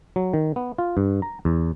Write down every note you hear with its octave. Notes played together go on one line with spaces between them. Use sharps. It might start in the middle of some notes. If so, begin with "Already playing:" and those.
F#3
D#3
B3
F4
G2
A#5
E2